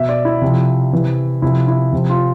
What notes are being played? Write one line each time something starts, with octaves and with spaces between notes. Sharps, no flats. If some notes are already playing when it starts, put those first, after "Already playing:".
Already playing: B2 E5
D5
E4
C3 F3
C3 E3
C3 F3 E4
E4
C3 F3
F4